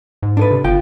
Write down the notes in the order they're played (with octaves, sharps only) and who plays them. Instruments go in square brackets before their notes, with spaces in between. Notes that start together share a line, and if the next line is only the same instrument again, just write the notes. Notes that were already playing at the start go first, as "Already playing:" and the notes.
[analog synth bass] G#2
[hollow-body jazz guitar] D4 A4 B4
[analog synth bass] C3
[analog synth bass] G1 [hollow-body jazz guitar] F4 G5